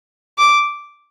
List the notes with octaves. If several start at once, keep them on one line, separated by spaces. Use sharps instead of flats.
D6